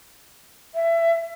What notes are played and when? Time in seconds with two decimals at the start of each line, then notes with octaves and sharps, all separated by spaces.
0.75 E5